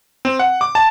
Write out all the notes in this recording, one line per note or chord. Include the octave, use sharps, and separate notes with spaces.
C4
F#5
D6
A5